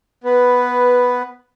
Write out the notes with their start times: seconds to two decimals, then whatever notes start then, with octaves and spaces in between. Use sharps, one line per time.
0.24 B3 B4